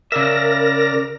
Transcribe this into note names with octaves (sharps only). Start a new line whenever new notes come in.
C#3 A#4 D5 E5 A#6